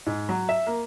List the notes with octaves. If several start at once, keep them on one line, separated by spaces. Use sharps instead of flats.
G#2
F#3
E5
A#3